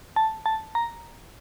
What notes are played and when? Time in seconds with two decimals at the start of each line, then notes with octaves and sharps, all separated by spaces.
0.16 A5
0.46 A5
0.75 A#5